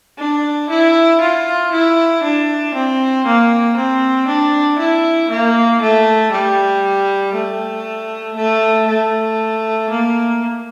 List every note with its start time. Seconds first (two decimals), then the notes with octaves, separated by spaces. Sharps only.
0.18 D4
0.70 E4
1.21 F4
1.72 E4
2.23 D4
2.74 C4
3.26 A#3
3.76 C4
4.27 D4
4.78 E4
5.30 A#3
5.81 A3
6.32 G3
7.34 A3
8.36 A3
8.88 A3
9.90 A#3